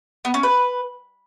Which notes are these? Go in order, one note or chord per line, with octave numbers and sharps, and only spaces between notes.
B3
C#4
B4